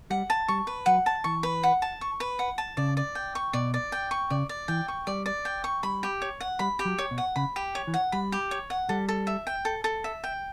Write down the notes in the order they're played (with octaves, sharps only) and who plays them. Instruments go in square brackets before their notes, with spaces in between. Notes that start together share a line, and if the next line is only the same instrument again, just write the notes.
[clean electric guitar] G3 [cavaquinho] F#5
[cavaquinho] A5
[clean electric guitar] G3 [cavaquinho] C#6
[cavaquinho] B4
[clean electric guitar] F#3 [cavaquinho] F#5
[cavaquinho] A5
[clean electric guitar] E3 [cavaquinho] C#6
[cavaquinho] B4
F#5
A5
C#6
B4
F#5
A5
[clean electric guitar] C#3 [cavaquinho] D5
[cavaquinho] D5
G5
C#6
[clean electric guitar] B2 [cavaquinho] D5
[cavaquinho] D5
G5
C#6
[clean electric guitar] C#3 [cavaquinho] D5
[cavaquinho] D5
[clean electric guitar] E3 [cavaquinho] G5
[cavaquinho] C#6
[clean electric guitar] G3 [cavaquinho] D5
[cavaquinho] D5
G5
C#6
[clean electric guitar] G3 [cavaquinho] B5
[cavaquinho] G4
C#5
F#5
[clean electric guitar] G3 [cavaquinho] B5
[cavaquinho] G4
[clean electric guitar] F#3
[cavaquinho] C#5
[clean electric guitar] B2
[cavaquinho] F#5
[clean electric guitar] C#3 [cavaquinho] B5
[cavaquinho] G4
C#5
[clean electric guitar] E3
[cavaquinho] F#5
[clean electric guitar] G3 [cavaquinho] B5
[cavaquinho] G4
C#5
F#5
[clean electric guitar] G3 [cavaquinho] A4
[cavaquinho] A4
E5
G5
A4
A4
E5
G5